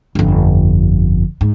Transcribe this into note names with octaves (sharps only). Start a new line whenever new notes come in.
G1 F2
G#2